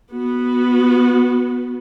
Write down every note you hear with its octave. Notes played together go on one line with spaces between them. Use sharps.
B3 F#4